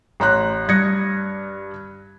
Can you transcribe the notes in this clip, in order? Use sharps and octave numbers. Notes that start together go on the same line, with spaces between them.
A1 A#5 C6 F#6
G2 D#6 G#6 A#6 C#7